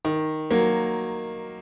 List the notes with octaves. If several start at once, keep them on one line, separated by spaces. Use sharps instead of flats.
D#3
F#3 A#3